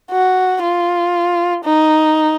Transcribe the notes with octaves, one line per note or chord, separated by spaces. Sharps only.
F#4
F4
D#4